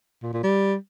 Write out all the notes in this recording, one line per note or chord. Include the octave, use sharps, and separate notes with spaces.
A#2
A#2
G3